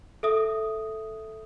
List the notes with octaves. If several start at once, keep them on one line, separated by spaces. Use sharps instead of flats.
A4 E5 D#6